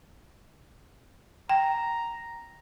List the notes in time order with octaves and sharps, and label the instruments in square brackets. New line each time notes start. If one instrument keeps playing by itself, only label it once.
[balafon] G5 [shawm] A#5